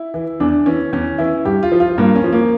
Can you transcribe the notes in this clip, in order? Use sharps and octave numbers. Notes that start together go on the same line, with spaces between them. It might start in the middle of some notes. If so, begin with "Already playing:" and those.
Already playing: E4
E3
E2 D4
E3 C#4
E2 C#4
E3 E4
G2 G4
F4
F3
F4
G2 A#3
C#4
F3
A#3